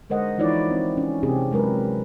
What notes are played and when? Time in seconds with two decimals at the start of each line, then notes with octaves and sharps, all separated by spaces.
0.09 D3 G#3 A#4 C5 D#5 F#5
0.38 E3 F3 D#4 E4 C#5 D5
0.71 C4
0.97 C#4
1.23 C3 C4 C#4 G4 G#4
1.51 F#3 G#3 A#4 B4